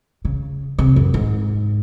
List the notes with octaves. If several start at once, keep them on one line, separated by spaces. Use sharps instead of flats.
C#3
C3
F#2
G#2